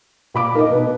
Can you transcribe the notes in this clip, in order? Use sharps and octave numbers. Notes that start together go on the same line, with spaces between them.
A#2 B5 D6
D#4 A#4 D#5
B2 B4